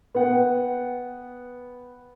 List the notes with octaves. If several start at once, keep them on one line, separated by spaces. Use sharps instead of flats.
B3 F#5 G5